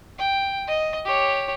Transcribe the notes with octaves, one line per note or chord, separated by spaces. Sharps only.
G5
D#5
G4 C#5